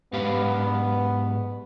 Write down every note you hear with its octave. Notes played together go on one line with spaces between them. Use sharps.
G#2 B3 G4 F5